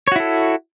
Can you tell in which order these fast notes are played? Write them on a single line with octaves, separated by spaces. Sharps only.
C#5 F#4 E4 A4